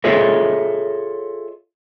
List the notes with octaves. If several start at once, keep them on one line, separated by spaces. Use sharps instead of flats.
F4 G#4 A4 C#5 D#5 E5